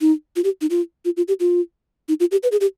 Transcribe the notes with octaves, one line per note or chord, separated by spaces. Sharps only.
D#4
F4
G4
D#4
F4
F4
F4
G4
F4
D#4
F4
G4
B4
G#4
G4